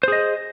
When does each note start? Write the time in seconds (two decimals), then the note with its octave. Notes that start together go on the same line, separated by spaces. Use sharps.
0.03 C5
0.08 G#4
0.12 D#5